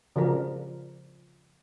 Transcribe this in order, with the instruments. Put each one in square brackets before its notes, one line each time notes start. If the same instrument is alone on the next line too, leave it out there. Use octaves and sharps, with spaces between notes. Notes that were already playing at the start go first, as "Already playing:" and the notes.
[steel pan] C#3 F3 D4 A#4